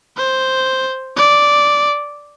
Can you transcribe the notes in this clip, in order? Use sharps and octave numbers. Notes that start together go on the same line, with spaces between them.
C5
D5